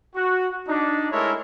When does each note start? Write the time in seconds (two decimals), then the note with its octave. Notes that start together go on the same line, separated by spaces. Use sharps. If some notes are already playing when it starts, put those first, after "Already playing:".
0.15 F#4
0.68 D4 D#4
1.12 G#3 A3 E4 A4 A#4 C#5